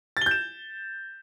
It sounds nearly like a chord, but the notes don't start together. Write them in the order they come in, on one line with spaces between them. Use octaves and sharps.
A6 G7 G6 E7